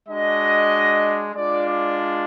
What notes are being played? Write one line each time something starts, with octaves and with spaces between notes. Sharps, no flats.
G#3 D4 F#4 D#5
G#3 D4 F4 D5
D5